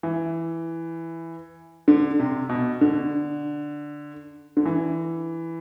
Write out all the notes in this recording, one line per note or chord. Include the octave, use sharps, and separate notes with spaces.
E3
D3
C3
B2
D3
D3
E3